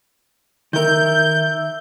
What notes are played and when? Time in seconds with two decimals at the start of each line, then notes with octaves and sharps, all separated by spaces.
0.73 D#3 A#4 E5 G6